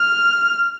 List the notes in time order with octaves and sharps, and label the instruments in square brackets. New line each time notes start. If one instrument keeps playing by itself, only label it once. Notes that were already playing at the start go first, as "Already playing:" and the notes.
Already playing: [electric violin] F6